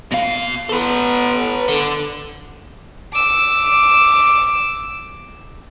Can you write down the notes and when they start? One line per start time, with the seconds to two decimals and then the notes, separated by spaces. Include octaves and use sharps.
0.12 B2 F5
0.69 B3 A4 B4
1.68 D3
3.13 D6 E6